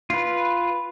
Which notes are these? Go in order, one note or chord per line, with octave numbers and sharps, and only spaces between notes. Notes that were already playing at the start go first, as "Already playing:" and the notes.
F4 B4